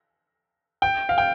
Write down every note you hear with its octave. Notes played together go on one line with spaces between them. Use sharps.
G5
F5
G5